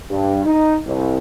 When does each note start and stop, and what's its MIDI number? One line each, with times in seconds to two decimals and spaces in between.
0.10 0.45 43
0.45 0.77 63
0.86 1.17 36